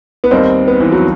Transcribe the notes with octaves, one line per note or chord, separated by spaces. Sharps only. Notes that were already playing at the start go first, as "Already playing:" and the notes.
B3
D#2 D#3 G3 C4 D#4
B3
E3
F#3